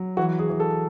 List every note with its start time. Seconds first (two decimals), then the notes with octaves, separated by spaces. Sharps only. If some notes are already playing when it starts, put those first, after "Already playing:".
Already playing: F#3
0.17 E3 F#4
0.39 G#4
0.49 E3
0.60 A4